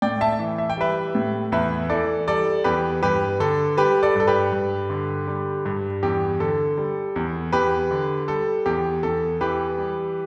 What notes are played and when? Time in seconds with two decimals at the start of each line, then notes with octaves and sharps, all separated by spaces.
0.02 A2 D5 G5
0.21 E5 A5
0.39 E3
0.58 E5
0.70 G5
0.77 G3 B4 E5
1.15 A2
1.52 E2 B4 E5
1.90 E3 A4 D5
2.28 G3 A4 D5
2.64 E2 G4 B4
3.03 G2 G4 B4
3.40 D3 A4
3.77 G3 G4 B4
4.03 A4 D5
4.15 G2 A4
4.27 G4 B4
4.52 G2
4.90 D3
5.28 G3
5.66 G2
6.03 E2 G4
6.40 D3 A4
6.78 G3
7.16 E2
7.52 E2 G4 B4
7.91 D3
8.28 G3 A4
8.66 E2 G4
9.03 E2 A4
9.41 E3 G4 B4
9.78 G3